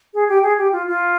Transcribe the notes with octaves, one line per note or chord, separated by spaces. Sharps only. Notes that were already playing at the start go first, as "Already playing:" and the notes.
G#4
G4
G#4
G4
F4
F4